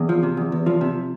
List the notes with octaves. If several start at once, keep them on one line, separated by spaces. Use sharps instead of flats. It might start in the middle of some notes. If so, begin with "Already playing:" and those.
Already playing: E2
F3
C3
E2
E2
F3
C3